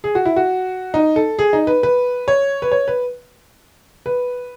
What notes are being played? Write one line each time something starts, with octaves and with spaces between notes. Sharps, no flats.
G#4
F#4
E4
F#4
D#4
A4
G#4
D#4
B4
B4
C#5
B4
C#5
B4
B4